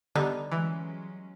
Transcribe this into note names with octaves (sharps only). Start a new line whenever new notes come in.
D3 G3 B3 D#4
E3 F#3 G#3 C#4